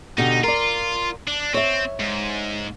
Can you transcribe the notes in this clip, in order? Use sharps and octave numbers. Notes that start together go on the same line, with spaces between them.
B2 D3 D#4 G4
F4 A#4 D5
D4
C4 C#5 E5
G#2